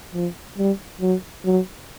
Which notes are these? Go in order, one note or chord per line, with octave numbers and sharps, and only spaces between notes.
F3
G3
F#3
F#3